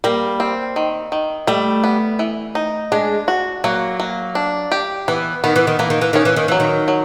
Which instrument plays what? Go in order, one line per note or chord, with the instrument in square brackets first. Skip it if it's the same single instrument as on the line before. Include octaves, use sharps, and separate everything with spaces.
[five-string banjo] G3 [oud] A#3
[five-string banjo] C4
D#3
D#3
[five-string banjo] G3 [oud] A3
[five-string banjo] B3
E3
D#4
[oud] G#3 [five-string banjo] D4
[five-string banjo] F#4
[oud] F#3 [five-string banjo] A#3
[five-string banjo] A#3
D4
G4
[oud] E3 [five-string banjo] B3
[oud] D#3 [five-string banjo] B3
[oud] E3
D#3
[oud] E3 [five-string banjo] A#3
[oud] D#3
E3
[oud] D#3 [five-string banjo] C#4
[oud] E3
D#3
[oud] E3 [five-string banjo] F#3
[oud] D#3
[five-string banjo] F#3